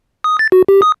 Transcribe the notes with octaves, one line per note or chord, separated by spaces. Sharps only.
D#6
A6
F#4
G4
D#6